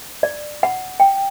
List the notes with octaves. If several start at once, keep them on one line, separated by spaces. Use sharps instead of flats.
D5
F#5
G5